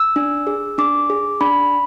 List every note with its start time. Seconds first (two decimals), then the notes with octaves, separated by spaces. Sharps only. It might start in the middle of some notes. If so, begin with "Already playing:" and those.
Already playing: E6
0.16 D4
0.47 G#4
0.78 D4 D6
1.10 G#4
1.41 D4 B5